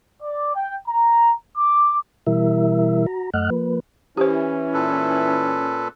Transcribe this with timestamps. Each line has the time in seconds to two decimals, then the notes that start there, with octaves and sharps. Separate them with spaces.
0.20 D5
0.55 G5
0.87 A#5
1.56 D6
2.27 B2 E3 G3 E4 A#4 E5
3.06 F#4 A#5
3.34 F#2 A3 D#5 F#5 F6 F#6
3.50 F3 A#3 B4
4.17 E3 C#4 E4 G4 C5
4.74 A#2 A4 B4